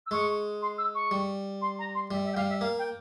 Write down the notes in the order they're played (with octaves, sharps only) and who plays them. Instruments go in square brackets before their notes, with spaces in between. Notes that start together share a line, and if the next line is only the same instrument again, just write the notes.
[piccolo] E6
[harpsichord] G#3 [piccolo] C#6
[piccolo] C6
E6
C#6
[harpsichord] G3
[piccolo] C6
A#5
C6
[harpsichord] G3 [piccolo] E5
[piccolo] E5
G5
[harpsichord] G3 [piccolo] F5
[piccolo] E5
[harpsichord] A#3 [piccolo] F5
[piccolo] G5